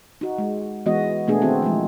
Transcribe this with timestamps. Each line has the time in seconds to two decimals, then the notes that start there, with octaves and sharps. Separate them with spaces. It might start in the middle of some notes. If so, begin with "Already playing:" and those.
0.21 D#4 F#4
0.38 G#3
0.86 E3 G#3 B3 F#4 D#5
1.27 B2 A3 B3 D4 G#4
1.41 D#3 B3 C4 E4 F#4
1.62 E3 F3 G#3